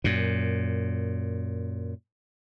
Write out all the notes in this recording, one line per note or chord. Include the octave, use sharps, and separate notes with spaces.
F#2 A#2